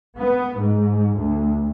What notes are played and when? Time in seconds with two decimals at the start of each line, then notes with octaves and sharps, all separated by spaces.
0.18 B3
0.57 G#2
1.16 D2